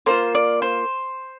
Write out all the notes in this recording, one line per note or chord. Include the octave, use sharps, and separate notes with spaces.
A#3 D4 F4 C5
D5
C5